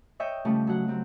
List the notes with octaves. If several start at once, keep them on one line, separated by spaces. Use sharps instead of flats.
C#5 D#5 E5 G5
C#3 F3 G3 A3 C#4
F#3 F#5
F#3 C4